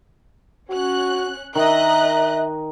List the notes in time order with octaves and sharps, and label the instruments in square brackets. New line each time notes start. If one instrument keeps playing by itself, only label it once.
[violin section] C#4 F#6 [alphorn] F#4
[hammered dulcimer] D#3 [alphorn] A#4 [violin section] D#5 F#6 [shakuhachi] E5